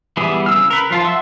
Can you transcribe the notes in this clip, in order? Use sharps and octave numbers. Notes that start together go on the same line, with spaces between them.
E3 G3 B3 E4 G#4
C#3 E6 F6
A#4 B4
F3 F4 A5
E5 F#5 C6 E6